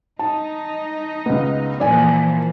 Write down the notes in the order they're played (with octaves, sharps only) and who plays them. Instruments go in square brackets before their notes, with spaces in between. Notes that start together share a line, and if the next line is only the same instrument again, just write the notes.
[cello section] D#4 [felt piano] A5
[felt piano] C#2 B3
[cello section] A#2 E3 F3 [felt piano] D5 G#5